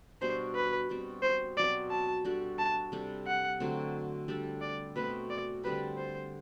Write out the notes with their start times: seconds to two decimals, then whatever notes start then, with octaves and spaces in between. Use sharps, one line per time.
0.21 B2 G3 D4 C5
0.55 B4
0.89 B2 G3 C4
1.22 C5
1.57 B2 F#3 C4 D5
1.90 A5
2.25 G3 D4 F#4 A4
2.58 A5
2.92 C3 G3 D4 A4
3.27 F#5
3.60 D3 F#3 A3 C4
4.28 G3 D4 A4
4.61 D5
4.96 B2 A3 C4 B4
5.30 D5
5.63 D3 G3 C4 G4 B4
5.97 C5